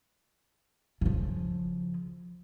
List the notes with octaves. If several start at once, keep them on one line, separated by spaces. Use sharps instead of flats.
C#3 F3